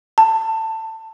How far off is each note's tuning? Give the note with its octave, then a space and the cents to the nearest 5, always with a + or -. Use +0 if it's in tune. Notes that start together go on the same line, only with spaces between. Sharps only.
A5 +20